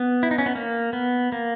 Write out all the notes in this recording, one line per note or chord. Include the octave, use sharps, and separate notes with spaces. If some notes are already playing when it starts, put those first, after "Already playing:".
Already playing: B3
E4
D#4
C#4
B3
A#3
B3
A#3